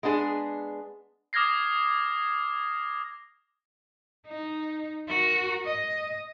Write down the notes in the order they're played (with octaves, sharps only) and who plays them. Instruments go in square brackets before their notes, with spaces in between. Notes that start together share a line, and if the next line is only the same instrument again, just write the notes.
[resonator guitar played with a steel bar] G#3 B3 D4 G#4
[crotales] D6 D#6 F6 G#6 A#6 C7
[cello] D#4
F#4 A#4
D#5